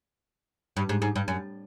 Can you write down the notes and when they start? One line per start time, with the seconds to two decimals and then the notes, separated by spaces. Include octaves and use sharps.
0.77 G2
0.89 G#2
1.02 G#2
1.16 G2
1.28 F#2